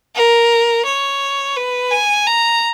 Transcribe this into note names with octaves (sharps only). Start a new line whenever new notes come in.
A#4
C#5
B4
G#5
A#5